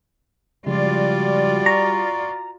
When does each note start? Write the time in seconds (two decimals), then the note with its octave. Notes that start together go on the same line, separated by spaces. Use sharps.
0.66 C#3 F3 G3 G#3 F4 F#4 D5
1.66 A#5 C#6